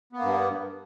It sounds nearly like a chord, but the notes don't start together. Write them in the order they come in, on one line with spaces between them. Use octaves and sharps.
B3 A#3 G2